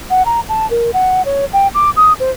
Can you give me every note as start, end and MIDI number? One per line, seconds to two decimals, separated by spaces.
0.10 0.25 78
0.25 0.40 82
0.49 0.68 81
0.70 0.90 70
0.93 1.25 78
1.25 1.45 73
1.53 1.67 79
1.74 1.90 86
1.96 2.13 87
2.20 2.31 72